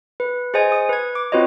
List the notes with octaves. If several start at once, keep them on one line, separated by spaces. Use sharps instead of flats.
B4
G#4 C5 D#5 G#5 G#6
D#6
B4 G#6
D6
C4 F4 F#4 B4 C#5 D#5